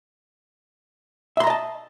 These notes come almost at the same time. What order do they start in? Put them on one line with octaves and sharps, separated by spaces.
E5 C6 A#5 D#5 A5